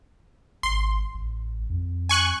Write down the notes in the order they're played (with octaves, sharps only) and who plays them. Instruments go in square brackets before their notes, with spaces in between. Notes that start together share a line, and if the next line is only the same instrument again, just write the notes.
[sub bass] G#1 [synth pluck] C6
[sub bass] A1
F2
[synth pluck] G#5 C#6 F#6